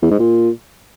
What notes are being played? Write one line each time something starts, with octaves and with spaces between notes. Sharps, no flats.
E2
G#2
A#2